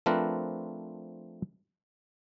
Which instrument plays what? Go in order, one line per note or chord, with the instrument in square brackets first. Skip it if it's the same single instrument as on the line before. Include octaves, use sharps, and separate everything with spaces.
[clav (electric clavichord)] F3 A3 C4 D4 A#4 B4